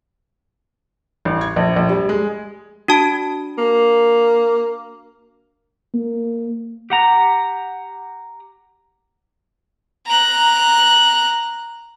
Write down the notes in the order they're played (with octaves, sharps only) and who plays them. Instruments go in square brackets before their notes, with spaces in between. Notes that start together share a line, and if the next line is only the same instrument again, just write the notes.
[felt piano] A1
G#6
A#1
A#1
G3
G#3
[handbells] D4 F#4 A5
[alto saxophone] A#3
[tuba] A#3
[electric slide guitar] G4 F#5 A#5
[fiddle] A#5 F#6